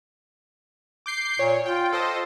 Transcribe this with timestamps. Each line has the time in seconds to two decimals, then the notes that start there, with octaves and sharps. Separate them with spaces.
1.06 D6 G6 C7
1.39 A#2 C#5
1.66 F4 G5
1.93 A4 C5 D#5